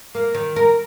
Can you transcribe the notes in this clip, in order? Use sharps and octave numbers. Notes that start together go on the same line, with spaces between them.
A#3
D#3
A#4